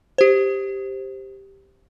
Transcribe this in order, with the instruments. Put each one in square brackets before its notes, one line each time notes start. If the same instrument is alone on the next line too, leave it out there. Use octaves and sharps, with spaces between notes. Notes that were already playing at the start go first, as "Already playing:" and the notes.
[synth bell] G4 C5